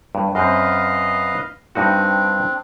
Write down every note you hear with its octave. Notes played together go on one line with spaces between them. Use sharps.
G2
F#2 C4 B4 D#5 F5
G2 C4 D4 D#4 F#4